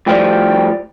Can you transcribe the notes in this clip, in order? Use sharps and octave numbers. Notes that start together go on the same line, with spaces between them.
A2 F3 G3 G5